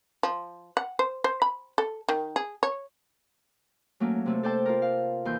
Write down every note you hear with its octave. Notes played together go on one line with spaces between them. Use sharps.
F3
F#5
C5
C5
B5
A4
D#3
G#4
C#5
F#3 A3 A#3 C#4
C3 A3 A4
A4 C5 D5 G5 A5
F4 A#4
F5
D#2 E3 C6 G6